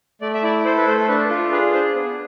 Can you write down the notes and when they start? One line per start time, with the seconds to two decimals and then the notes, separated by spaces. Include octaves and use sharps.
0.21 A3 D5
0.34 E5
0.43 E4 D5
0.65 A4 C5
0.77 B4
0.87 A3 C5
1.08 D4 B4
1.29 F4 A4
1.52 G#4 B4
1.73 D4 C5
1.94 B3